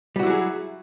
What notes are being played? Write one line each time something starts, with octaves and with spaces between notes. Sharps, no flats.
F#3 G3 E4 F#4 G#4